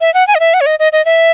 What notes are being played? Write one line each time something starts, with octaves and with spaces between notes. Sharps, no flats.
E5
F#5
G#5
D#5
E5
F#5
C#5
D#5
D#5
D#5
E5